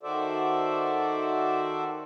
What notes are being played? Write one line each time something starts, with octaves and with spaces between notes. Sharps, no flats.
D#3 F#4 A4 C5 D5 E5